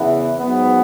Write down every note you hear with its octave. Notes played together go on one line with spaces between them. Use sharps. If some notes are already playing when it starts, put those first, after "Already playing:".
Already playing: E2 C#3 E3 B3 E4
G#2 F#3 B3